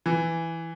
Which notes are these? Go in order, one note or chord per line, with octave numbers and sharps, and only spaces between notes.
E3